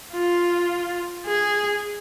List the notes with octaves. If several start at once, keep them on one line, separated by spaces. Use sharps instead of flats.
F4
G#4